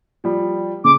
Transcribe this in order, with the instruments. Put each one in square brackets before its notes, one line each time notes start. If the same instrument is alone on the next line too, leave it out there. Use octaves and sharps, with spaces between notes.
[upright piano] F3 G3
[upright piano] C#3 [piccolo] D6